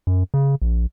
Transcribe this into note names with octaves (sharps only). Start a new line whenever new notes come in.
F#2
C#3
A#1